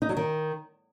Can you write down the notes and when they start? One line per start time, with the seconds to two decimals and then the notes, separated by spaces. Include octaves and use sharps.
0.02 D#4
0.09 F#3
0.17 D#3